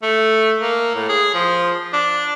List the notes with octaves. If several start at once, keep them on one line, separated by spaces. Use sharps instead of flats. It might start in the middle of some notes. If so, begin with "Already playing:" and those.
A3
A#3
A2
G#4
F3
D4